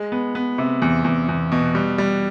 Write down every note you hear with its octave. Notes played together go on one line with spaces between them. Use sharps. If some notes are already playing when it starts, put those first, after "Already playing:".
Already playing: G#3
B3
B3
C3
E2
E2
E2
B2
G3
G3